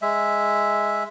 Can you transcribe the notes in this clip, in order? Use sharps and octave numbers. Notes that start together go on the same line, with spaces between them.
G#3 E5